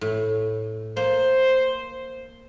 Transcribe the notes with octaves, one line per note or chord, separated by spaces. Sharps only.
A2
A#3 C5